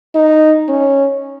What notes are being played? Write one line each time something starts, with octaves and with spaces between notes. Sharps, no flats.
D#4
C#4